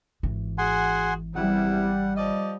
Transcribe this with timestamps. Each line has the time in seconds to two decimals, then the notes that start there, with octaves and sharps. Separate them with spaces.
0.23 G#1 E3
0.58 F#4 G#4 F#5 G#5 C6
1.35 E2 C3 G3 E4 F#5
2.17 F3 D5 D#5